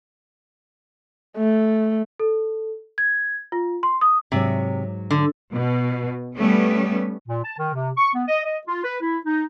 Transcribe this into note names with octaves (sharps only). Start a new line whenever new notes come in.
A3
A4
G#6
F4
C6
D#6
G#2 C3 F#3 C#5
D3
B2
G3 A3 B3 C#4
A#2
A5
D#3
C3
C#6
B3
D#5
D#5
F4
B4
E4
D#4